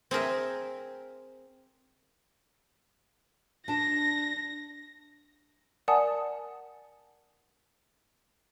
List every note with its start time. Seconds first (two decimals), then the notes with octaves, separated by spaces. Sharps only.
0.11 C4 G#4 A#4 E5
3.68 D4 A5 A#6
5.88 A#4 D5 F#5 G#5 A5 D#6